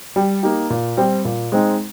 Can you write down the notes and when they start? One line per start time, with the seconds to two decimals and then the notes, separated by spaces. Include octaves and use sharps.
0.16 G3
0.43 A#3 D#4 G4
0.70 A#2
0.97 G3 C4
1.25 A#2
1.52 G#3 C4 D#4